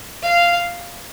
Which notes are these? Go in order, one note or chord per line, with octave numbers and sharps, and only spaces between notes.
F5